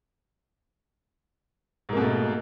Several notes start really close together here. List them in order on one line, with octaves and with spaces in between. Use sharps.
G#2 A#3 B2 A3